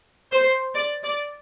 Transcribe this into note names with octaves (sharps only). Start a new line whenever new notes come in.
C5
D5
D5